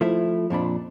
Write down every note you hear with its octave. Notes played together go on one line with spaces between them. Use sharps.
F3 A3 E4
F2 A#2 D4 B5